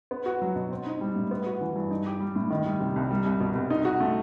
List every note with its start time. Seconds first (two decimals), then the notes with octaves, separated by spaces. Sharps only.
0.11 B3
0.26 F#4
0.42 F#3
0.56 B2
0.71 C4
0.86 D#4
1.01 G3
1.16 A2
1.31 B3
1.46 F#4
1.61 E3
1.76 G2
1.91 D#4
2.06 G4
2.20 G3
2.36 A2
2.50 D#3
2.66 G3
2.80 C3
2.96 C2
3.11 G3
3.25 C2
3.40 B2
3.55 C2
3.70 D#4
3.85 F#4
4.00 A3